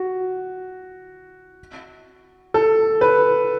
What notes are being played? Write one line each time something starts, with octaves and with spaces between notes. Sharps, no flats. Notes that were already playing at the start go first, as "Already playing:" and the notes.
Already playing: F#4
A4
B4